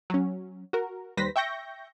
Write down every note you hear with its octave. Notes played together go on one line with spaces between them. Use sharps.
F#3 C#4
F#4 A#4
D#2 G3 B4 C5 A#6 B6
E5 G5 C#6 G6 A#6